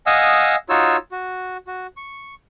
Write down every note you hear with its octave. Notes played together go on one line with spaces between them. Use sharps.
D#5 F5 F#5 G#5 D#6 E6
D#4 F4 F#4 C#5 E6
F#4
F#4
C#6